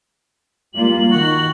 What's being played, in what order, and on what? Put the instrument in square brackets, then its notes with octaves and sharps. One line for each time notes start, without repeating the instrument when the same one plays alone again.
[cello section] G3 A#3 F4 [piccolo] F#7
[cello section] D#3 [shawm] F#4